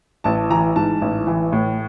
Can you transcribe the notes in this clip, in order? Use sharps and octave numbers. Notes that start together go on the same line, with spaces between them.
A1 A5
E3 A#5
G#2 A5
A1
E3
A2